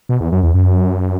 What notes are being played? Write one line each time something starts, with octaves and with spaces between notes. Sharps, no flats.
B2
E2
F#2
E2
F#2